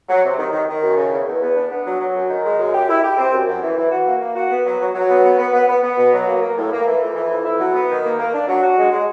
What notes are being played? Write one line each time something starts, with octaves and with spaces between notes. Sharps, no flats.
F#3
C3
D#3
D#3
D#3
F#2
C#3
E2
E2
B3
D4
B3
F#3
F#3
F#2
D#3
G#3
F#2
G4
E4
G4
C4
F#2
F#2
E3
E3
F#4
A#3
A#3
F#4
B3
F#3
F#3
F#3
B3
B3
B3
B3
B3
B3
B2
F#3
A#3
A#3
A2
A#3
E3
F2
E3
F2
E4
F#3
B3
D#3
A#3
A#3
D4
F#3
F#4
G#3
G#3